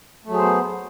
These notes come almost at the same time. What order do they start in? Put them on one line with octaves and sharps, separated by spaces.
A3 F#3 G#4 C5 B3